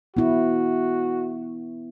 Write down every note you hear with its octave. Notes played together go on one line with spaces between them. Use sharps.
B3 E4 F#4